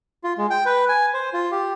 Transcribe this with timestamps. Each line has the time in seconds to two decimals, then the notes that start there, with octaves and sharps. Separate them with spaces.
0.24 F4
0.38 G#3
0.50 G5
0.66 B4
0.89 G#5
1.14 C5
1.33 F4
1.52 G4